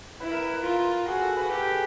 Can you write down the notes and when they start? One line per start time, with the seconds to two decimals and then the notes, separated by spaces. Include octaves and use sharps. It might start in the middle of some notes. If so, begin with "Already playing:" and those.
0.20 E4 B4
0.32 A#4
0.42 B4
0.54 B4
0.64 F4 A#4
1.08 F#4 G#4
1.22 A4
1.37 B4
1.51 G4 A4
1.68 G#4